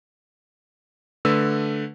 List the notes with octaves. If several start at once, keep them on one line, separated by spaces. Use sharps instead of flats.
D3 A3 B4 E6